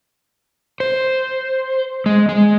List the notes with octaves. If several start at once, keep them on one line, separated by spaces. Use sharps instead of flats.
C5
G#3
G#3